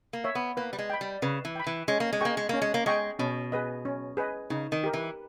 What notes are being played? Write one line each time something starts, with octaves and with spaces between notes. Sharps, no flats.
A#3
C#5 E5
B3
A#3 B4
G3
G#3
G5 B5
G3
C#3 B4
E3
G5 B5
E3
G#3 C#4
A#3
G#3
A#3 G#4 D#5 G5 C#6
G#3
A#3 C#4
G#3
A#3
G#3 G#4 D#5 G5 C#6
B2 C#4
G#4 B4 D#5
C#4
G#4 B4 D#5
C#3 D#4
D#3
G4 A#4
E3